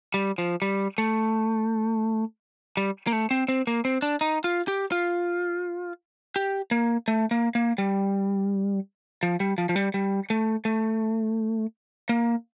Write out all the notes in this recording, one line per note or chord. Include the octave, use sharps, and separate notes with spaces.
G3
F3
G3
A3
G3
A#3
A3
C4
C4
A#3
C4
D4
D#4
F4
G4
F4
G4
A#3
A3
A#3
A#3
G3
F3
G3
F3
F3
G3
G3
A3
A3
A#3